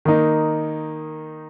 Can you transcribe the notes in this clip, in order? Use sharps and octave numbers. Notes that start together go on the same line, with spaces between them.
D#3 A#3 D#4